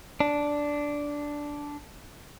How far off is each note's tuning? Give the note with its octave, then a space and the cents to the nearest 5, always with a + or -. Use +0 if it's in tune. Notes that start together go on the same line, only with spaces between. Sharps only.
D4 -5